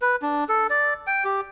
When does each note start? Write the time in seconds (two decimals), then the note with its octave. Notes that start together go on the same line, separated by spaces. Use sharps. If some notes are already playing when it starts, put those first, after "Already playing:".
0.02 B4
0.22 D4
0.49 A4
0.70 D5
1.07 G5
1.24 G4